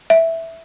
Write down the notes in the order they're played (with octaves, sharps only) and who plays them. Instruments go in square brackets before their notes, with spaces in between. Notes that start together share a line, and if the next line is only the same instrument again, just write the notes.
[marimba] E5